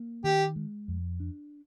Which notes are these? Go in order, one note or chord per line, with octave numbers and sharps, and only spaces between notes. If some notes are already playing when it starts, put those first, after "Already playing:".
Already playing: A#3
D#3 G4
G#3
F2
D4